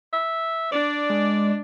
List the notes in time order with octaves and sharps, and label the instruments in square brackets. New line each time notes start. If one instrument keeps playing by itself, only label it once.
[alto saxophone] E5
[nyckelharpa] D4 [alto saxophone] D5
[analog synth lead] G#3